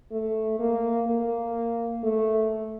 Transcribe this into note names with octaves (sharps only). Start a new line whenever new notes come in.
A3
A#3
A#3
A3